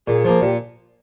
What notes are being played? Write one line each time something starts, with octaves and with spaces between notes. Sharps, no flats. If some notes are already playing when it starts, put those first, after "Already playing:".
A#2 G#4
F3 A#3
A#2 G4